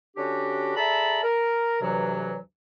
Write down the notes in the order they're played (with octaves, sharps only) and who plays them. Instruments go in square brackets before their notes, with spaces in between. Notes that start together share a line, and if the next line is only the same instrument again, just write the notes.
[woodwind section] D3 C#4 D4 F#4 G4
G#4 A4 D5 E5 A#5 B5
A#4
D2 G2 C3 E3 F#3